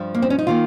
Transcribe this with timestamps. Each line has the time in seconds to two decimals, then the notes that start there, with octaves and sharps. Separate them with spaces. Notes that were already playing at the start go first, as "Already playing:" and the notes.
Already playing: G2 F3
0.14 A#3
0.22 C4
0.30 C#4
0.39 D#4
0.47 D#3 A#3 F4